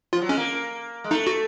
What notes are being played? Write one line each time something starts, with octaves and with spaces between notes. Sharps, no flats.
F3 F4
F#3
G#3 C#4
A#3
G#3
A3 D#4
F#4